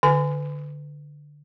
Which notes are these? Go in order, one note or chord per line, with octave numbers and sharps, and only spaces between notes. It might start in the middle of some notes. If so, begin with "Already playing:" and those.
D3 A4 G#5